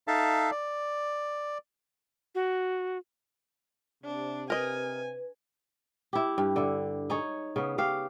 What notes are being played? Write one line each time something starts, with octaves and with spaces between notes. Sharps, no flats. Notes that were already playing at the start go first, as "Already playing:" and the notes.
D#4 A4 E5 F5 A5
D5
F#4
C3 D4
A#4 B4 D#5 G#5
E4 G4
G2
D3 E4
D#4 G#4 C#5
C#3 B3
C#3 G4 F5